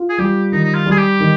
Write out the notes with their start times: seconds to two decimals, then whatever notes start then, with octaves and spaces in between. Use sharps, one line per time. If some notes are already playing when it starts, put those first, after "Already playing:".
Already playing: F4
0.09 G#4
0.18 G3 G4
0.52 D#3 D#4
0.64 D#4
0.74 F4
0.86 G3 G#4
0.97 G4
1.20 D#3